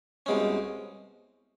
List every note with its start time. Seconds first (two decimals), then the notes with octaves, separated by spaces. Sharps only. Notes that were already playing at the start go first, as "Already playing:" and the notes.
0.26 C2 B2 G#3 C#4